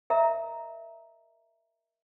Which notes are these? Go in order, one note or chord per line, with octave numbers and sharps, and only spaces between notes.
A#4 D#5 E5 A#5